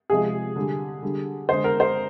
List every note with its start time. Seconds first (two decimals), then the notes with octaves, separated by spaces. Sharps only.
0.10 C3 F3 G#3 G#4
0.56 D3 G3
1.03 D3 G3
1.49 D3 G#3 C5
1.64 A#4
1.80 C5